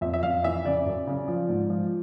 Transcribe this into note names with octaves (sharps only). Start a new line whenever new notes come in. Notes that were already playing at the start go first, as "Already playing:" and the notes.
F2 E5
E5
F2 F5
E3 E5
C#3 D5
F#2
C#3
F3
G#2
F3